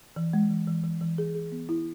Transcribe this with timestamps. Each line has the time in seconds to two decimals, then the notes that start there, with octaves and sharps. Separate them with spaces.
0.16 E3
0.33 G#3
0.50 E3
0.67 E3
0.84 E3
1.01 E3
1.18 G#4
1.35 G#4
1.52 B3
1.69 E4